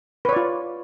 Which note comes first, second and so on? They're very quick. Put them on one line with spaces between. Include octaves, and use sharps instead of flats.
B4 C#5 D5 F4